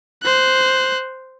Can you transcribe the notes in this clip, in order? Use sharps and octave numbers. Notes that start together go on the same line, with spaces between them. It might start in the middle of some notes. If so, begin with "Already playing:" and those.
C5 F#6